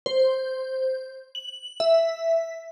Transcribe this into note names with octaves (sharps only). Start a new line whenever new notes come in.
C5
F#7
E5